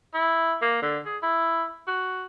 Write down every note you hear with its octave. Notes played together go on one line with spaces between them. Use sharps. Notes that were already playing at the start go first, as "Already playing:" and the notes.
E4
A#3
D3
G#4
E4
F#4